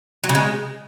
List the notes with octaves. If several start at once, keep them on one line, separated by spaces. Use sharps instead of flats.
F#3
C#3
G#3